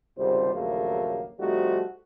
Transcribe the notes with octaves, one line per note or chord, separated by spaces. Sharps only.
G#1 C#2 C3 G3 C5
A#1 D#2 C#3 F#3 A3 A#3
C3 F3 G3 A3 D#4 F#4